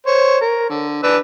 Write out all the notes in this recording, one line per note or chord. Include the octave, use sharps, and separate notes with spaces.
C5 C#5
A#4
D3
D4 B4 E6